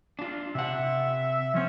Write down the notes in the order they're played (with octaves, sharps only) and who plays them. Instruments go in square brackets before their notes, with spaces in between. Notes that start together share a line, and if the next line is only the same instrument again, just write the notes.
[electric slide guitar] D4 F4
[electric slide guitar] C3 F#5 [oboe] E5
[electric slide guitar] F3 C4 [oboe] C#4